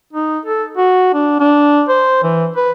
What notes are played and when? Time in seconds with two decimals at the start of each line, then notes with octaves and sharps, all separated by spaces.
0.13 D#4
0.45 A4
0.77 F#4
1.14 D4
1.40 D4
1.88 C5
2.23 E3
2.56 B4